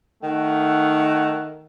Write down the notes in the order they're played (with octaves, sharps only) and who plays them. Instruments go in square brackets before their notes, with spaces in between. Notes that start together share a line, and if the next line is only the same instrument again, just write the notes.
[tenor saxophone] D#3 [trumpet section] A3 F#5